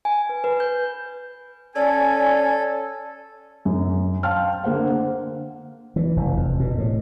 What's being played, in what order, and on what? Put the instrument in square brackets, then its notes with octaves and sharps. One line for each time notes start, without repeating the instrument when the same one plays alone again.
[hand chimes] G#5
B4
B4
G6
[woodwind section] C#4 G#5 [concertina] A4 [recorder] D5
[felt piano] F#2
F5 G5 A5 C6 F6
D3 A#3 C5 F#5
[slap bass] E3
F1
F2
B2
A2